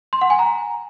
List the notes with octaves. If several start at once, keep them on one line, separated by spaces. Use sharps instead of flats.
C6
F#5
G#5
A#5